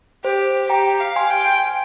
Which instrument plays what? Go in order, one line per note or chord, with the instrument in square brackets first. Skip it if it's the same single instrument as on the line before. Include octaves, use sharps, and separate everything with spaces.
[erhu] G4 [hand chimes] C5
[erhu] G4 [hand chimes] G5 A#5
[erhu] F5
[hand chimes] G#5 C6
[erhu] G5